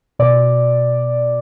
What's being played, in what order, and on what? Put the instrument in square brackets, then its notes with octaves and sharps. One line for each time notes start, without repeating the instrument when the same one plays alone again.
[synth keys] B2 D5